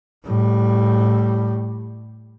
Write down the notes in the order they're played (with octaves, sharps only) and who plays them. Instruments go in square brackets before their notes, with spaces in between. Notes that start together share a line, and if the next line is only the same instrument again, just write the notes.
[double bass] A2 G3